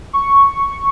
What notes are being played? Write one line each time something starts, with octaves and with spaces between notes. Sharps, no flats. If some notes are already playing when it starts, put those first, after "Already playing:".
C#6